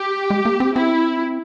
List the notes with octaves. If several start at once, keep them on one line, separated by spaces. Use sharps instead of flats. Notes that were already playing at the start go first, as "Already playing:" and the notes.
Already playing: G4
G#3
A#3
C4
C4 E4